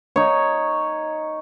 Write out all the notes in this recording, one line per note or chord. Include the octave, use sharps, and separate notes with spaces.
D#4 C#5